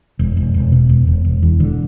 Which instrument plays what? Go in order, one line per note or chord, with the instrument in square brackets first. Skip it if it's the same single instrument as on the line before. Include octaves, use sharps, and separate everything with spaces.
[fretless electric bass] E1
E1
E1
B2
E1
E1
E1
E2
E1 D3